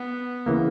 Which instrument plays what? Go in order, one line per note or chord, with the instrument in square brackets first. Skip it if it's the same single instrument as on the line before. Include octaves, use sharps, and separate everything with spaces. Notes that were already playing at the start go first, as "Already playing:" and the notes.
Already playing: [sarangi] B3
[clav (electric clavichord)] C#3 E3 A#3